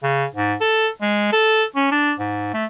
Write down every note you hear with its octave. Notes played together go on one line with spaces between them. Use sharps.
C#3
G#2
A4
G#3
A4
C#4
D4
G#2
A3